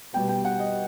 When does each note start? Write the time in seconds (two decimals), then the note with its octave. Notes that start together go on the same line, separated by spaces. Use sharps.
0.13 B2 G3 B3 G5
0.29 G5
0.45 F#5
0.59 D#5